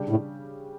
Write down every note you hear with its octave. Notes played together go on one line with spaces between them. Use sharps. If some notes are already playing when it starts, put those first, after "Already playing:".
Already playing: C#3 G3 D4 G4
A2